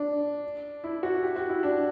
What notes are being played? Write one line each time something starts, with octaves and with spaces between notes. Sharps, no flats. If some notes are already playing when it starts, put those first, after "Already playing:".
Already playing: D4
E4
F#4
G4
F#4
E4
D4